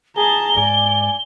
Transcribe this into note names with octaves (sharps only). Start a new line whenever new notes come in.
G#4 A5 A#5 G7
G#2 D5 G#5